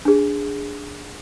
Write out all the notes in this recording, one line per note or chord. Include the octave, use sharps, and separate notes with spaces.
D4 G#4